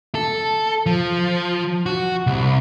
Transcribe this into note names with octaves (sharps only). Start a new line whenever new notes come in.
A4
F3
F#4
C2